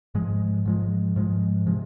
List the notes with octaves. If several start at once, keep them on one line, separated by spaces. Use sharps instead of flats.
G#2 F3 G#3
G#2 F3 G#3
G#2 F3 G#3
C3 F3 G#3